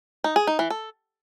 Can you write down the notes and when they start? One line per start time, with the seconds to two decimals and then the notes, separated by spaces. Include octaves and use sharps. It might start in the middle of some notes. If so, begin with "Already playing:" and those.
0.24 D#4
0.36 G#4
0.47 D#4
0.59 E3
0.70 A4